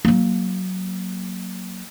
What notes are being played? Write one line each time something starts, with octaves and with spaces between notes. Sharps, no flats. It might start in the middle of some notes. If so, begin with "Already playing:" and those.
F#3 A#3